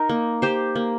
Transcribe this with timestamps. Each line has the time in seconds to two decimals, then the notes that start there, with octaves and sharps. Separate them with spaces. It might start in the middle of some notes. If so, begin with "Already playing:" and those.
Already playing: D#4 A#4
0.09 A#3
0.42 G4 C5
0.75 A#3